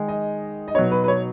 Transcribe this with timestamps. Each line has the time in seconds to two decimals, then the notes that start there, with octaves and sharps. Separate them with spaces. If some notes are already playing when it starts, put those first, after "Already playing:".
Already playing: D#3 G#3 D#4
0.08 D#5
0.68 D#5
0.74 B2 F#3 B3 D#4 C#5
0.91 B4
1.04 B4
1.08 C#5